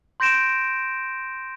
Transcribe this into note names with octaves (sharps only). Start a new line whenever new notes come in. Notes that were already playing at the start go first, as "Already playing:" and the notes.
C6 G6 A#6 D7 E7